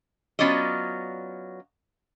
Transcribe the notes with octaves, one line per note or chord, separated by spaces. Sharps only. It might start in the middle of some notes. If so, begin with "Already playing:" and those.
F#3 B3 C#4 F4 D5 D#5